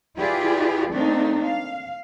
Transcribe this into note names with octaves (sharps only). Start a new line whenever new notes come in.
E4 F4 G4 G#4 B4 D5
A3 A#3 C4 D4 D#4
F5